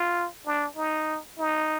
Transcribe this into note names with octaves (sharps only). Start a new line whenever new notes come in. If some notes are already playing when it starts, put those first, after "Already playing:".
Already playing: F4
D4
D#4
D#4